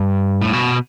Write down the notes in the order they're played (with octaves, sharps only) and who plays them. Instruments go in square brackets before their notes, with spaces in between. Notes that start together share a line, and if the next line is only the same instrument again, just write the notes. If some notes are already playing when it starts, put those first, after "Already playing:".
Already playing: [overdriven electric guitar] G2
A2
B2